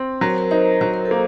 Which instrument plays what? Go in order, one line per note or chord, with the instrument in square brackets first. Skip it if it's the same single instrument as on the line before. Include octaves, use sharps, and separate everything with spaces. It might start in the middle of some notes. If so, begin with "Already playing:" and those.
Already playing: [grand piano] C4
[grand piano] F#3 [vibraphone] A#4
[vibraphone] C5
A#4
[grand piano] D#4 [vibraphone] C5
[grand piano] F#3 [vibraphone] C5
[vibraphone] A#4
A4
[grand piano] A#3